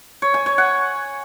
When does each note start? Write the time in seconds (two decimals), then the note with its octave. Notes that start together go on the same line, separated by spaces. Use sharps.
0.22 C#5
0.34 G#5
0.46 C#5
0.58 F#5